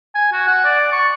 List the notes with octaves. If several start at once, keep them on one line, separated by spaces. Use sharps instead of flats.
G#5
F#4
F#5
D5
C#6